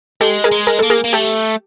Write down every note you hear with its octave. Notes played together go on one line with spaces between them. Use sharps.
G#3 G4 A4
G#4 A#4
G#3
G#4 A#4
A#3 A4
G#4 A#4
A#3
A3 G4 A4